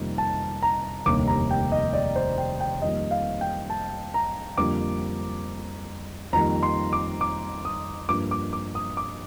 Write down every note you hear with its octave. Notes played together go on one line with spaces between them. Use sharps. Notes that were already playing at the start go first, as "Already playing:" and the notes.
Already playing: F2 C3 D#3 G3 A#3
A5
A#5
F1 D#2 D3 G3 A#3 D6
A#5
G5
D#5
D5
C5
G5
G5
F2 D#3 G3 A#3 D#5
F5
G5
A5
A#5
F2 D3 G3 A#3 D6
F2 D#3 G3 A#3 A#5
C6
D6
D6
D#6
G2 F3 A#3 D6
D6
D6
D#6
D6